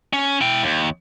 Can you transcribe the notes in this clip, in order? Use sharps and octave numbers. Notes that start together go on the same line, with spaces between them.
C#4
E4 G5
D#2